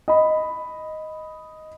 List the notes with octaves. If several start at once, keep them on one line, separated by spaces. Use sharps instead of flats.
D#5 B5